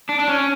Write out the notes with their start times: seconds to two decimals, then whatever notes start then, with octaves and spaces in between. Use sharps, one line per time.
0.09 D4
0.19 D4
0.28 C#4